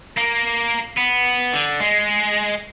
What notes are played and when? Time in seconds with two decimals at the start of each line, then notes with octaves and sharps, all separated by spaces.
0.17 A#3
0.97 B3
1.53 D3
1.80 G#3